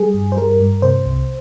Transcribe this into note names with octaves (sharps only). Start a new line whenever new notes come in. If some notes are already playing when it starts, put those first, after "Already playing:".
Already playing: G3 G#4
G2
C5
G3 A#4
G2
C3 C5
C2